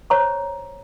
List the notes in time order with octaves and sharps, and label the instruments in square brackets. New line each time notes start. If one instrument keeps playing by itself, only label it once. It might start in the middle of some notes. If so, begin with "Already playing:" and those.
[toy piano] C5 C#5 A#5 C#6